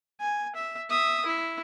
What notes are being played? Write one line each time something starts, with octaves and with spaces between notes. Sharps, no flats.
G#5
E5
E5 D#6
E4